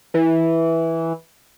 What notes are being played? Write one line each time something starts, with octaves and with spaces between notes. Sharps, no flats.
E3